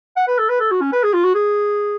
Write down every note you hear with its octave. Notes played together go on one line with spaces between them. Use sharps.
F#5
B4
A4
B4
A4
F#4
C#4
B4
G#4
F4
F#4
G#4